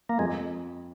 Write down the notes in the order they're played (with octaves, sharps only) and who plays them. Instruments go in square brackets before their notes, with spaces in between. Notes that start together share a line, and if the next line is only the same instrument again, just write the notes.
[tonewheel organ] A#3
[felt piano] F2 [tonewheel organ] G#3